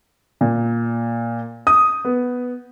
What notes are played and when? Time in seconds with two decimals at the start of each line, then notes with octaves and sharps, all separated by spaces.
0.41 A#2
1.67 D#6
2.05 B3